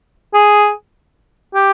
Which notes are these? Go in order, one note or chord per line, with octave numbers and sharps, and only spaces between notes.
G#4
G4